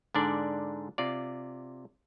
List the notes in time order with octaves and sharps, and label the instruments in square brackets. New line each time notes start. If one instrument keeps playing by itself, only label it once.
[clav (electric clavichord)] G#2 D3 D4 D5
C3 F4 D5